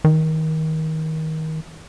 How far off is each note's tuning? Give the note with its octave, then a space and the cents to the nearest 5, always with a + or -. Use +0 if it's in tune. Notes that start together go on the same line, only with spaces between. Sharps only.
D#3 +25